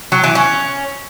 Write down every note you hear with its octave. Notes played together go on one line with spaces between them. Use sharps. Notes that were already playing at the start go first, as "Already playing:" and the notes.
F#3
E3
C#4